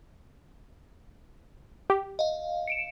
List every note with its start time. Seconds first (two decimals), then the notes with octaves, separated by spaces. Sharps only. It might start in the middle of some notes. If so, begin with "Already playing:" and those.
1.90 G4
2.19 D#5 F5
2.67 C#7 D7 E7